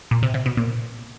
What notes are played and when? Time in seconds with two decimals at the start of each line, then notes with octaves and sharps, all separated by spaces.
0.11 A#2
0.23 C3
0.34 C3
0.46 B2
0.57 A#2